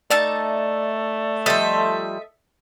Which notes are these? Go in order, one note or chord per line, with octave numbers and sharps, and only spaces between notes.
A3 D#4 D5 E5 A5
F3 G3 A4 D#5 E5